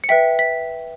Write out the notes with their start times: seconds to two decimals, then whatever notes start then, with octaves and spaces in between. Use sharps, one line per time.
0.04 C#7
0.09 B4 E5 G5 B6
0.39 B6